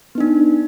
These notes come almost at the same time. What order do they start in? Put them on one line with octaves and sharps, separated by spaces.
B3 D#4 D4